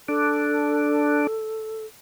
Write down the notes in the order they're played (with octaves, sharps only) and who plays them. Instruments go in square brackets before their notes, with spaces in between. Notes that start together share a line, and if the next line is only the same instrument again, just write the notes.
[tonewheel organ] D4 [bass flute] A4